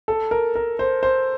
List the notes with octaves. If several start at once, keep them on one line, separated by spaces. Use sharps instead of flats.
A4
A#4
A#4
C5
C5